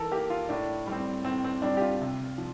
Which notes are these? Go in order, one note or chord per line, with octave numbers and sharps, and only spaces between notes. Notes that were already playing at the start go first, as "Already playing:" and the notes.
Already playing: E3 A4 A#4
A#3 G4
F4
A2 D4
G3 C4
A2 C4
C4
G3 C4 D4
G4
F4
C3
F3